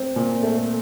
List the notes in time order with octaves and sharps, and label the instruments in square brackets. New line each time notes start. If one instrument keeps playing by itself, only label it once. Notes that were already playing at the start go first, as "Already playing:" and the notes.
Already playing: [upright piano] C4
A#2
A3